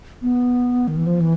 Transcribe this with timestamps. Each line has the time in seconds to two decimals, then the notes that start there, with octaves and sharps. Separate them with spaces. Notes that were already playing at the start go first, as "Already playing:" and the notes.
0.22 B3
0.88 D#3
0.97 E3
1.07 F3
1.21 E3